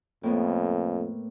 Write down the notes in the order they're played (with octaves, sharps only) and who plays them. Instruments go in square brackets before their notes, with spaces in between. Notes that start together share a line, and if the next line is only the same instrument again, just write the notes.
[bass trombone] F2 [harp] A2 A#3 B3